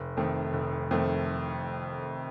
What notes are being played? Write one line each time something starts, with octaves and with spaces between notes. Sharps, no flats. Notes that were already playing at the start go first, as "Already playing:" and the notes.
Already playing: F1
F2 D#3 A3
F1
F2 D#3 A3